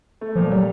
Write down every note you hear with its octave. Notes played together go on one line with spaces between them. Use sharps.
A3
A#2 F3
F#3 G3